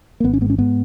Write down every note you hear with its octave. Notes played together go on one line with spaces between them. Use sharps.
A#3
G#1 B3
C#4
G#2 B3
C#4
G#2 B3